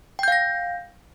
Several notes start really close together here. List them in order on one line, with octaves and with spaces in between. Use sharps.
G5 G6 F5 A#6